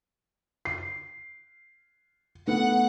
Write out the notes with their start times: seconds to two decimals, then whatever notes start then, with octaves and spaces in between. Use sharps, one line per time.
0.65 C7
2.47 A3 B3 F#5